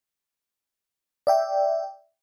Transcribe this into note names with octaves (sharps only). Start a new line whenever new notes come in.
D5 E5 G5